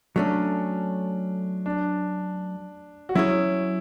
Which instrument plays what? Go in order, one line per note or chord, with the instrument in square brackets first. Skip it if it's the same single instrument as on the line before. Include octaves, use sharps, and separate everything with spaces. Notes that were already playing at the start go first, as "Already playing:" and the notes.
[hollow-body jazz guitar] F#3 A3 C#4 [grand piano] D4
[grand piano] D4
F#4
[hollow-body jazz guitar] F#3 C#4 G#4 C#5 [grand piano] E4